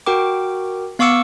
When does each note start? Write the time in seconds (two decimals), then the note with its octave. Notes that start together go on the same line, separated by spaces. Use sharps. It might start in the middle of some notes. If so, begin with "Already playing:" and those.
0.06 F#4 A#4 G5 D6
0.99 B3 F5 C#6 D6 E6 C#7